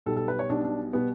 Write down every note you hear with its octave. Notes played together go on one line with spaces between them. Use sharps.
B1 B2 G3 A4
A4
B4
C#5
B1 B2 G3 D4
D4
B2 G3 B3